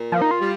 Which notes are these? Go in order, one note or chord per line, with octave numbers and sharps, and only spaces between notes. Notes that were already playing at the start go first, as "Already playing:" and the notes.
Already playing: A#2
F3 A#3
D#4
F4
G3